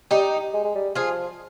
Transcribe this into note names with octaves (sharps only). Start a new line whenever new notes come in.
G3 D#4 G4
G#3
G#3
G3
F3 F4 G#4